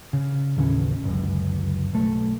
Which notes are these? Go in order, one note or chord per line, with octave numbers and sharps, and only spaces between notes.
C#3
A1 D#2 C#3 C#4
G1 C#2 F#2
B1 A3